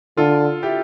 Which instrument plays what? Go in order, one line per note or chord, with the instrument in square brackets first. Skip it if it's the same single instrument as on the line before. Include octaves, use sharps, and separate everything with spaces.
[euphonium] D3 [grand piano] F4 A4
[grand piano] E4 G4